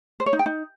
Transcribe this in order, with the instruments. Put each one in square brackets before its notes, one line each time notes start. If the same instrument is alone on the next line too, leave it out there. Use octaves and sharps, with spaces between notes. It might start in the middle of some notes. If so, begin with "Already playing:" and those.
[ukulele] C5
C#5
D#4
G5
D#4